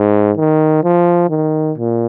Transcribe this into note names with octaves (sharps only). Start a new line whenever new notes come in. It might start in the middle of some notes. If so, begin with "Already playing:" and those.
Already playing: G#2
D#3
F3
D#3
A#2